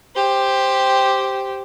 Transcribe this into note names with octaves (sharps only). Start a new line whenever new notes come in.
G4 C5